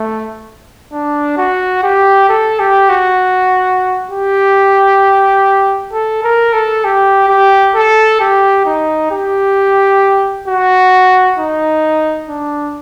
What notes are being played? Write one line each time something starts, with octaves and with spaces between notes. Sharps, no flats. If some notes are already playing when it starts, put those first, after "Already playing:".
Already playing: A3
D4
F#4
G4
A4
G4
F#4
G4
A4
A#4
A4
G4
G4
A4
G4
D#4
G4
F#4
D#4
D4